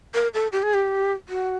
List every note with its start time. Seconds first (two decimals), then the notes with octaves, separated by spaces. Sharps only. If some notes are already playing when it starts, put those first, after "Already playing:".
0.14 A#4
0.34 A4
0.52 G4
0.63 G#4
0.74 G4
1.29 F#4